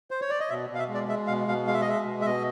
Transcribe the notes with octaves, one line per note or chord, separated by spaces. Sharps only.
C5
C#5
D5
D#5
B2 E5
B2 F5
E5
G#3
D5
G#3 E5
B2 F5
B2 F5
G#3 F5
E5
D#5
G#3 E5
B2
E5
B2 D#5